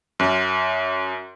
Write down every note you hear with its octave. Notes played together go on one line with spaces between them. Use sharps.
F#2